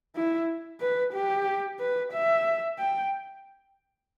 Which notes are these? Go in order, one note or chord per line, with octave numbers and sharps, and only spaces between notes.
E4
B4
G4
B4
E5
G5